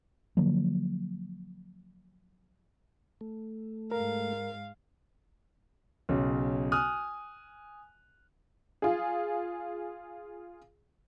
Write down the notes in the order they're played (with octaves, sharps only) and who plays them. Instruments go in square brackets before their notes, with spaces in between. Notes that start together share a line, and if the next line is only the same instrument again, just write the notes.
[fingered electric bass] D3 F3 F#3 A#3
[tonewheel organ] A3
[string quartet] G#2 F5 [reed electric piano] A#4
[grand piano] B1 C#3
G#5 D#6 F6 F#6
[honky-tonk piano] F4 G#4